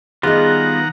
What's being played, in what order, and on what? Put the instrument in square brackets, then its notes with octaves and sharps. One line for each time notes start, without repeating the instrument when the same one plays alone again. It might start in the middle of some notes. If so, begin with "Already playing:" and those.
[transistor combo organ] D#3 F#5 A#5 [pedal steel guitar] G3 B3 F4 [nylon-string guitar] G#4 D#5